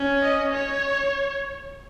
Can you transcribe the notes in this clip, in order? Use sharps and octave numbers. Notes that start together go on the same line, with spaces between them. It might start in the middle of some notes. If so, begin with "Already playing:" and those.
Already playing: C#4
D#5
C#5